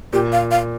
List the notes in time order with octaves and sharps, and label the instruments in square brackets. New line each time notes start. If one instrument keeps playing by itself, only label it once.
[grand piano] A#2 [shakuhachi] G4
[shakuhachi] F5
F5